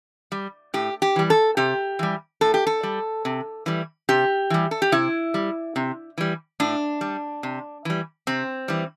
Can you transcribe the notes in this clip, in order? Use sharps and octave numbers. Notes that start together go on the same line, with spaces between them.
G3
A2 G4
G4
E3 G3
A4
C3 G4
E3 G3
A2 A4
G4
A4
G3
C3
E3 G3
C3 G4
E3 G3
A4
G4
C3 E4
G3
C3
E3 G3
A2 D4
G3
C3
E3 G3
C3 C4
E3 G3